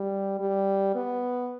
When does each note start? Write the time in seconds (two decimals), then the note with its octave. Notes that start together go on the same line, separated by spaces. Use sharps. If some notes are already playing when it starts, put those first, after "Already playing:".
Already playing: G3
0.40 G3
0.95 B3